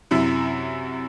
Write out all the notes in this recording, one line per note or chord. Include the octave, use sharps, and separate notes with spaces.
F#2 C3 E4